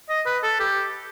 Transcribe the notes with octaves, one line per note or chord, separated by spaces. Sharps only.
D#5
B4
A4
G4